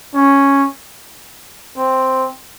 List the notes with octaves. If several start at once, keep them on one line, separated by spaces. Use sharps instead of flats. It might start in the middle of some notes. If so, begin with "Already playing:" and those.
C#4
C4